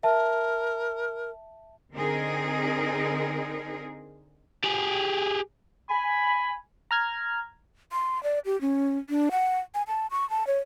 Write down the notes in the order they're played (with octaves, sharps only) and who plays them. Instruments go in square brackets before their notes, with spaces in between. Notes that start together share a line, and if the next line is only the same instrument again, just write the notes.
[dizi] A#4 [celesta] E5 A5
[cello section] D3 C4 D#4 G#4 A#4
[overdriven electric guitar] G4 G#4
[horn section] G#5 B5
[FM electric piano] A#5 F6 G#6
[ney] C6
D5
G4
C#4
D4
F#5
G#5
A5
C#6
A5
C#5